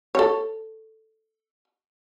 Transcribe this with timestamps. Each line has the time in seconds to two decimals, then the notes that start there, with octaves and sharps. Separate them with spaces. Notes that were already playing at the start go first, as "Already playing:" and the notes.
0.15 A4 C#5